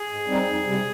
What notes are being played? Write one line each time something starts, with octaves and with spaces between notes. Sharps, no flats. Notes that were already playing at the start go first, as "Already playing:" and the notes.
Already playing: G#4
G#2
G3 C4 D#4
F2
C3 G3